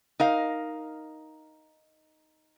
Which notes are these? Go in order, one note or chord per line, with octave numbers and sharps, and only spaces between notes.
D#4 A#4 F5